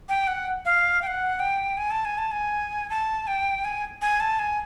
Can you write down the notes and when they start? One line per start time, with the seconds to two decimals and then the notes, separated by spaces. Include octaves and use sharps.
0.09 G5
0.27 F#5
0.65 F5
1.02 G5
1.07 F#5
1.39 G5
1.77 G#5
1.91 A5
2.05 G#5
2.18 A5
2.31 G#5
2.90 A5
3.27 G5
3.65 G#5
4.02 G#5
4.20 A5
4.39 G#5